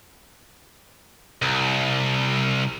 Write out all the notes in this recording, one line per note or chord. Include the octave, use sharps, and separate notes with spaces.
C2